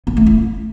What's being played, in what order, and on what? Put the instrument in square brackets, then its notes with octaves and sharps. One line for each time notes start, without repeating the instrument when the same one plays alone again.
[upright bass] B3
A3
E4